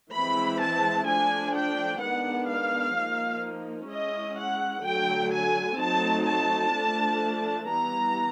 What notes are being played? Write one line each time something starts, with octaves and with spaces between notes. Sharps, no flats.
E3 G#3 C4 E4 B5
A5
F3 A3 D4 G#5
G5
D#3 G#3 B3 D4 F#5
F5
F3 A#3 D#4
G#3 C#4 E4 D#5
F#5
D3 F#3 A3 G5
G#5
F#3 A3 C4 D#4 A5
A5
F3 A3 D4
E3 G3 B3 A#5